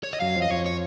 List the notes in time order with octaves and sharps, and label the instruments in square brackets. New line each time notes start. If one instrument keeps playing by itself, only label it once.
[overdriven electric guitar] C#5
D#5
[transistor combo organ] F#2 F#3 [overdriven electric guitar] F5
[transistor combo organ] F2 F3
[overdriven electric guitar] D#5
[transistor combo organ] F2 F3 [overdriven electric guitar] C#5
[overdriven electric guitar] C#5